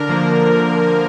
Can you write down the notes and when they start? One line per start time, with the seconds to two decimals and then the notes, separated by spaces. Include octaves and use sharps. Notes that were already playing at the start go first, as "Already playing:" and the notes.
Already playing: D3 A#4
0.09 F3 A#3
0.52 D3